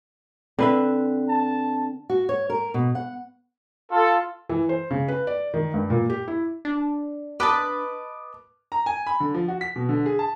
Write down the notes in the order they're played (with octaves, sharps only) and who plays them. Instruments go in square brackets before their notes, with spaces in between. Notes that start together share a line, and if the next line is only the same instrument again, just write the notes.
[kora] D3 B4 E5 [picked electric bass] C4
[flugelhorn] A5
[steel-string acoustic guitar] F#4
C#5
A#4
B2
F#5
[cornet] F4 [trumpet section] A4
[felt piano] E3
C5
C#3
B4
D5
D#3
G2
A#2
G4
E4
[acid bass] D4
[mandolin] B4 D#5 A5 [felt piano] D6
[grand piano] A#5
G#5
B5
D3
F3
F#4
B6
B2
D3
G#4
A5